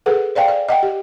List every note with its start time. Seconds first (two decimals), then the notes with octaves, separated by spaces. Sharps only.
0.06 G#4 A4 B4 F#5
0.35 C5 D5 F5 G5 G#5
0.48 D5
0.69 D#5 F#5 G5
0.83 G4